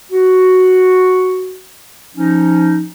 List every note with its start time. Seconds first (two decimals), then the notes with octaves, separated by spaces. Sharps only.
0.12 F#4
2.15 F3 C#4 D#4